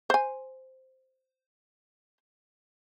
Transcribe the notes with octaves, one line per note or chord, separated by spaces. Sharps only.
C5 G#5